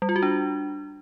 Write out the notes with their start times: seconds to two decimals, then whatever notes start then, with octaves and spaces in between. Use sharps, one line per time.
0.02 G3
0.09 F4
0.16 F#4
0.23 D4